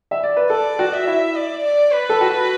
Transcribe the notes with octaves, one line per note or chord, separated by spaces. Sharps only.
E5
D5
B4
A4 D5
F#4
E5
E4
D5
D5
B4
A4
F#4